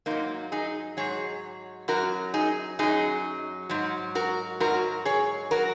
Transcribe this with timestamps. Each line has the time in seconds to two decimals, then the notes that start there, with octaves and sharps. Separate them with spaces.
0.06 G#2 F#3 A#3 D#4
0.52 D#4 G#4
0.97 G#2 F#3 G#4 C#5
1.88 F#2 F#3 F#4 A#4
2.34 D#4 G#4
2.79 F#2 F#3 D#4 G#4
3.69 G#2 F#3
4.15 F#4 A#4
4.60 G#2 F#3 F#4 A#4
5.05 G#4 C#5
5.51 F#3 F#4 A#4